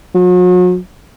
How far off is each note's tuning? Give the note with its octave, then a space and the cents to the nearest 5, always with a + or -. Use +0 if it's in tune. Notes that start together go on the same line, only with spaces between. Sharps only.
F#3 -40